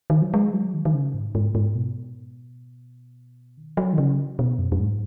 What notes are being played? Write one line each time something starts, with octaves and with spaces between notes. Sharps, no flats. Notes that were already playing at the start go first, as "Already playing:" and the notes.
D#3
F#3
G#3
F#3
D#3
D#3
C#3
G#2
G#2
G#2
B2
D#3
F#3
D#3
C#3
B2
F#2
F#2
G#2